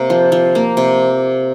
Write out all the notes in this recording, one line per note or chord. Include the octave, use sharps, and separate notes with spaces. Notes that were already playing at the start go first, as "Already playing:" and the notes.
Already playing: C3 A#3
F3
F3
A#3
C3